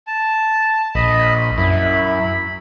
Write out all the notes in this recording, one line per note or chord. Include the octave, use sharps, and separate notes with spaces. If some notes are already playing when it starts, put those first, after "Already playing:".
A5
A#1 D#5 B5
F#2 E4 B5